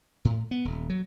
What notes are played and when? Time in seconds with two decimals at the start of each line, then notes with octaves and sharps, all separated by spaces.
0.25 A2
0.51 B3
0.65 D#1
0.90 F#3